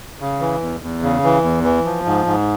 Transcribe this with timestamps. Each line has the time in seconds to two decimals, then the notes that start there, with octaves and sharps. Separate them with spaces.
0.20 C#3
0.41 E3
0.62 E2
0.82 E2
1.03 C#3
1.24 E3
1.43 E2
1.64 E3
1.85 F3
2.06 G#2
2.26 G#2